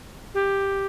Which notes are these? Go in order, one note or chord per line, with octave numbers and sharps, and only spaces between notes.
G4